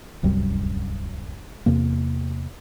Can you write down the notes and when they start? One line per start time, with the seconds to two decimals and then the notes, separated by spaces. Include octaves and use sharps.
0.23 D1 C2 F#2 G3
1.66 E2 C3 A#3